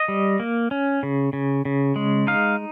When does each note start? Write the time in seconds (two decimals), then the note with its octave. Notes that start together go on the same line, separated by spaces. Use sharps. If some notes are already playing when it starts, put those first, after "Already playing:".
Already playing: D#5
0.08 G3
0.40 A#3
0.71 C#4
1.03 C#3
1.33 C#3
1.65 C#3
1.96 G#3
2.27 D#4 F5